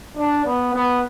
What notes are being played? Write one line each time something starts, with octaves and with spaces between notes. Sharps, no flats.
D4
B3
B3